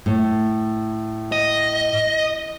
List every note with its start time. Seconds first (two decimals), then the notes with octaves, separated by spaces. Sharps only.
0.06 A2
1.32 D#5